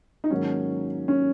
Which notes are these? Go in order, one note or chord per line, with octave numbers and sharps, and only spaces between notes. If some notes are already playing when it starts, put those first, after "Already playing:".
D#4
G#2 D#3 F#3 A#3 C#4
C#4